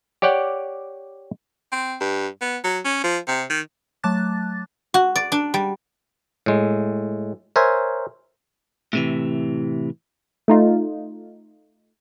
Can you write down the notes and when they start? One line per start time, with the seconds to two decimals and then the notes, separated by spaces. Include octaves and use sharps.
0.22 G4 C#5 D5 F#5 G5
1.72 C4
2.01 G2
2.41 B3
2.64 F#3
2.85 C#4
3.04 F3
3.27 C3
3.50 D#3
4.04 F#3 A3 A5 D6 F#6 A6
4.94 F#4
5.16 D5
5.32 D4
5.54 G3
6.46 A2 G#3
7.56 A#4 C5 C#5 E5 G#5
8.93 A2 C3 E3
10.48 A3 D#4 F4